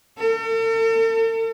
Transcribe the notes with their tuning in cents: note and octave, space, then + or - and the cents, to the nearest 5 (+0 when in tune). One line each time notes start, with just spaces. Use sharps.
A4 +45